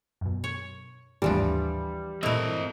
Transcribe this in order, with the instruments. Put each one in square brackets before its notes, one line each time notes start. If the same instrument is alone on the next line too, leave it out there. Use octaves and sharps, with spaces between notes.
[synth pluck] F#2 B2
[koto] C#5
[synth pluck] G#1 D#2 A2 [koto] E3 F3 D4 [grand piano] G3
[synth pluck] A#2 E4 [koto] A3 A#4 [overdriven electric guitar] C4 D#5